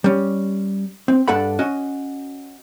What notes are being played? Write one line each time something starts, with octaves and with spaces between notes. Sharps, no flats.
G3 C#4
C4
G2 D4 A4 F#5 B5
C#4 F#4 D#5